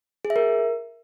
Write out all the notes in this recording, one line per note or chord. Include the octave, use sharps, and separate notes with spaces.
G#4
E5
A#4